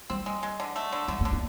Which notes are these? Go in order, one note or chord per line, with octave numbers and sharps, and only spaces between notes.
G3 C4
G#3
G#3
D3
A3
D3
D3 G3
A3
D3
A#3